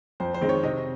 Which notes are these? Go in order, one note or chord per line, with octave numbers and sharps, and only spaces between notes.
F2 C5
C5
D#3 G#3 C4
C#5
C3 D#5